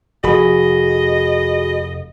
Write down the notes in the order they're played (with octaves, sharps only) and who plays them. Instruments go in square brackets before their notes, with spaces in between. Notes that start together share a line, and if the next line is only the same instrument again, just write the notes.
[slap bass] F1 [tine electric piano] F#4 G#4 B5 [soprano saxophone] D#5